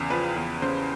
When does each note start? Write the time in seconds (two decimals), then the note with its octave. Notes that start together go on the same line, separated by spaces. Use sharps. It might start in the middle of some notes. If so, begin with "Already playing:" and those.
Already playing: E2 C#3 G4
0.10 F3 B4
0.36 E2
0.62 C#3 C5